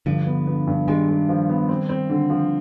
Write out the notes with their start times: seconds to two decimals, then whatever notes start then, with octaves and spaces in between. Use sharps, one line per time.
0.06 G2 D3 F3
0.26 B3
0.47 B3
0.67 G2
0.88 D#3 G3 G#3
1.08 G#3
1.29 F3
1.49 B3
1.69 C4
1.89 C4
2.10 D3
2.30 F3